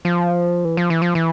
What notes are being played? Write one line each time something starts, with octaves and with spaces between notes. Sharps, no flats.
F3
E3
F3
E3
F3
E3